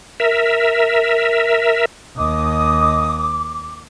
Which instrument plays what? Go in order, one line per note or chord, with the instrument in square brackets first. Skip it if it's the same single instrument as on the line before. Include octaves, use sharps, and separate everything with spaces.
[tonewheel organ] A#4 E5
[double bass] D#2 [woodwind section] D#5 D#6 [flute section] D6